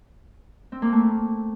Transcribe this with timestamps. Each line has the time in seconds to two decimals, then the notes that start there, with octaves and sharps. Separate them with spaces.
0.72 C4
0.82 A#3
0.92 A3